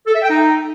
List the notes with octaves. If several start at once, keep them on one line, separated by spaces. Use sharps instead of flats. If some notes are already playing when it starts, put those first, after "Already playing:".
A4
E5
G5
D#4